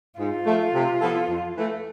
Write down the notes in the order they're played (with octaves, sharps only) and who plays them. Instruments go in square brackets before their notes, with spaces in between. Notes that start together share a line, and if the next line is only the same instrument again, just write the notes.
[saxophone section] G#2 [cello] F4
[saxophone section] F3 A3
C3
F3 B3 E4 A4
F2
E3 A3